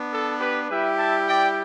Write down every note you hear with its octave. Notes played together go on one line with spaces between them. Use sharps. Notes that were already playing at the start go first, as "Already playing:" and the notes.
Already playing: B3 D4
A4
G4 B4
G3 E4 G4 B4 E5
E5 A5
D5 G5